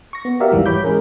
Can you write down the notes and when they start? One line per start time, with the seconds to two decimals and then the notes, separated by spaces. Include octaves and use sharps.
0.13 C#6 A#6
0.25 B3
0.40 F#4 G4 A#4 D5 E5 F5
0.52 B1 E2 G#2 E3 G3
0.66 C#5 B5 D6 G6
0.84 G#3 C#4 G#4 A#4